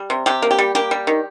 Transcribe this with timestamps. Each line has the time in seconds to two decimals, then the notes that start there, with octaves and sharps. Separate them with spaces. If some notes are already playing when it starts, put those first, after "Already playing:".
Already playing: G3
0.10 C3
0.26 C3 G4
0.42 A#3
0.51 G4
0.58 G3
0.75 A#3 G4
0.91 G3
1.07 D#3